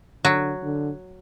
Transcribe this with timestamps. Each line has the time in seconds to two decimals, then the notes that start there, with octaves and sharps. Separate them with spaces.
0.25 D3 F#3
0.63 D3